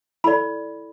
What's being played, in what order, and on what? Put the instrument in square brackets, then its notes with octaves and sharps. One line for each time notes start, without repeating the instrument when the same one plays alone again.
[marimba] E4 A4 [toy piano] D5 B5